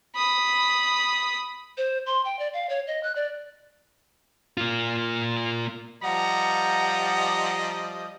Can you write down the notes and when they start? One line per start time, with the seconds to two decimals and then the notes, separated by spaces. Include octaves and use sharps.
0.16 B5 D#6
1.78 C5
2.06 C6
2.25 G5
2.39 D5
2.54 F5
2.69 C#5
2.87 D#5
3.03 F#6
3.16 D5
4.58 A#3 F4
6.03 F3 G3 D#5 F#5 A#5